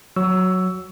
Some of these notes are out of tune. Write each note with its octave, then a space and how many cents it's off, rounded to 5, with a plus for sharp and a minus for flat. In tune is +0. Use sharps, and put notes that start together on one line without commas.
F#3 +0 C#6 +25 E6 +0